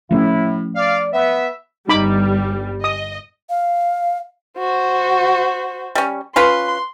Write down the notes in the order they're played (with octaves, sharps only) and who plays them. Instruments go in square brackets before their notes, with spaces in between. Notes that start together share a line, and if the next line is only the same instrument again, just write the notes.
[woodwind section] A2 [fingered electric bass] F3 A3 C#4 [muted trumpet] E4
[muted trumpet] D5 [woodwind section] F5
[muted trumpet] B3 [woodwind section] E5
[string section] G1 G3 [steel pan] D#4 B5 D6
[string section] D#5 [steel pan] D#6
[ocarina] F5
[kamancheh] F#4 C5
[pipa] G3 C#4
[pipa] C#4 F4 B4 [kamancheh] C6